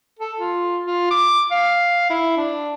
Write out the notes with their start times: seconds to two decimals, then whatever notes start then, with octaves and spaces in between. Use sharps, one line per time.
0.19 A4
0.40 F4
0.86 F4
1.11 D6
1.51 F5
2.10 E4
2.37 D4